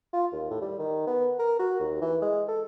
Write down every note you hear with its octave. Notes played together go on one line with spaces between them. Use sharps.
F4
D#2
A2
G3
D#3
B3
A#4
F#4
D#2
E3
G#3
A4